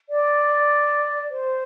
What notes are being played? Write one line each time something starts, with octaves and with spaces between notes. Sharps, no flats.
D5
C5